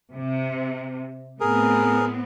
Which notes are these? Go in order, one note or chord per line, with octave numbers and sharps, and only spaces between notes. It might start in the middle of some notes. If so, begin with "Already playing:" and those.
C3
A2 B3 C4 G#4 A#4